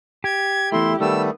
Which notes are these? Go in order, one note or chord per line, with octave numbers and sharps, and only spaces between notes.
G4 G#6
E2 A3 E4 C6
D#3 G3 A3 B3 E6